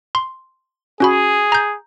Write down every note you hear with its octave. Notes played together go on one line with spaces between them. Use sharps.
C6
C#4 F#4 G#4 B5
A#5 G6